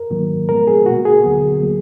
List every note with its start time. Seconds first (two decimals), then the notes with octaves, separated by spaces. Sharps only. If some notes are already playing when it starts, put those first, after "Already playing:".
Already playing: A#4
0.10 G#2 D#3 F#3 A#3
0.48 A#2 F3 G#3 B3 A#4
0.67 G#4
0.86 B2 A#3 F#4
1.05 G#4
1.24 D2 D3 F#3 B3
1.62 F#3 A#3